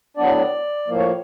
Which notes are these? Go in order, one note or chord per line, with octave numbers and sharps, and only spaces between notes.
A2 F#3 B3 D4 D5
A2 F3 A#3
C#5